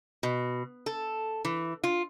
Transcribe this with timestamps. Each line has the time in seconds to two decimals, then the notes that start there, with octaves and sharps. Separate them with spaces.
0.23 B2
0.86 A4
1.45 E3
1.84 F4